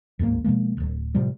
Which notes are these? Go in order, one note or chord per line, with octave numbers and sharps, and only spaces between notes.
D1 A1 G#2 A#3
B2 F3 G#3 A#3
D1 G#1
A2 C3 F3 G3